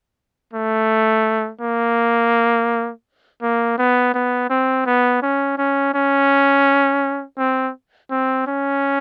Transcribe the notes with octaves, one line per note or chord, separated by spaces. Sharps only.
A3
A#3
A#3
B3
B3
C4
B3
C#4
C#4
C#4
C4
C4
C#4